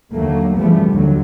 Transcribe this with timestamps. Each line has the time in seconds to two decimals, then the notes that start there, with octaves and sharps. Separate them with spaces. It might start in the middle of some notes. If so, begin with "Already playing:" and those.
0.14 D#2 D3 F#3 A3 A#3
0.57 C#3 E3 F3 G3 A3 B3
0.90 D#2 D3 F#3